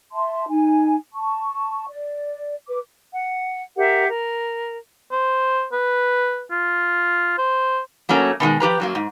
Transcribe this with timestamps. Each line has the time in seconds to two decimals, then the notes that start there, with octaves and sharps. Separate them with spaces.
0.12 E5 A5 C6
0.49 D#4 G#5
1.14 A5 C#6
1.87 D5
2.68 B4 D6
3.13 F#5
3.77 G4 A#4 E5 F#5
4.08 A#4
5.12 C5
5.72 B4
6.51 F4
7.38 C5
8.09 F#3 A3 A#3 C#4
8.40 B2 D#3 E3 G#3
8.60 F3 G4 B4 A#5
8.80 F#2 F#3 A#3
8.95 G#2